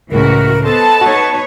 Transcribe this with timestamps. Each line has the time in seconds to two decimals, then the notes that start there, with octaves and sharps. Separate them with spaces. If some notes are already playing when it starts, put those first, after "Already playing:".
0.12 C#2 A2 C#3 E3 G#3 F#4 A#4
0.64 B3 A4 C5 D#5 A5
1.01 D#4 F#4 B4 C#5